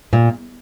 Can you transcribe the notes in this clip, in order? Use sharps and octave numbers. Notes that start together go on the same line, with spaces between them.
A#2